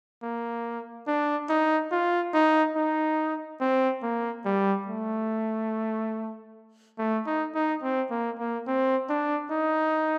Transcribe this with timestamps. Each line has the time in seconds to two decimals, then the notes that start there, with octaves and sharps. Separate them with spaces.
0.23 A#3
1.07 D4
1.49 D#4
1.92 F4
2.34 D#4
2.76 D#4
3.61 C4
4.03 A#3
4.45 G3
4.87 A3
6.99 A3
7.27 D#4
7.55 D#4
7.83 C4
8.11 A#3
8.39 A#3
8.67 C4
9.10 D4
9.52 D#4